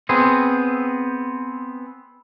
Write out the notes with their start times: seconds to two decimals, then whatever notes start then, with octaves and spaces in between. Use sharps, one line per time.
0.09 B3 C4 G#4